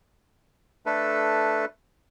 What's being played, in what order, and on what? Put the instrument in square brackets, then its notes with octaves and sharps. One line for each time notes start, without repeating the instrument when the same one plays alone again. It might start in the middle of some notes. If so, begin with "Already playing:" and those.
[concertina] A3 D4 A4 B4